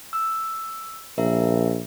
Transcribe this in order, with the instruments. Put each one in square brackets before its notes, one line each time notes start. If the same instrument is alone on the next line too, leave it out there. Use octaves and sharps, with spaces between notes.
[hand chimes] E6
[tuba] A#1 [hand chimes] A#4 E5